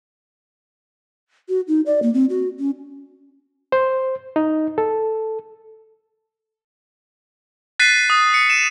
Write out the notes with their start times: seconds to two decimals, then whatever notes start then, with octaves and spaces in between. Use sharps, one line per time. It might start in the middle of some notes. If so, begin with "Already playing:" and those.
1.49 F#4
1.68 D#4
1.86 D5
2.02 A#3
2.14 C4
2.30 F#4
2.59 C#4
3.72 C5
4.36 D#4
4.78 A4
7.79 F#6 A6 B6 C7 D#7
8.10 D#6
8.34 C#7
8.50 D#7 E7